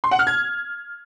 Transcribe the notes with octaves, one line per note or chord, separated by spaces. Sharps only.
C6
F#5
F6
G#6